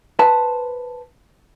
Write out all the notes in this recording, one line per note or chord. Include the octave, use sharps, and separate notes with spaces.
B4 C5 A5